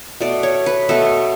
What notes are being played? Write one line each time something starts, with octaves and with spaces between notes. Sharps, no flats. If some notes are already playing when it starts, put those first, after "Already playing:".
B2 A3 D5
C#5
B4
B2 A3 A4